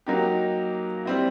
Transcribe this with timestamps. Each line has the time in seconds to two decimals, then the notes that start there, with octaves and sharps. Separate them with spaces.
0.07 F#3 A#3 D#4 G4
1.05 G3 C4 E4